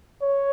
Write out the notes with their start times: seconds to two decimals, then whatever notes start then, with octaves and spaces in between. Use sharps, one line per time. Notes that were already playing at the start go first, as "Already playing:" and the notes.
0.22 C#5